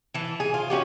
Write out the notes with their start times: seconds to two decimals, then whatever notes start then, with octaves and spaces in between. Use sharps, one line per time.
0.14 E3 A5
0.40 G#4
0.54 F4
0.70 C#4 D#4 F#4 G4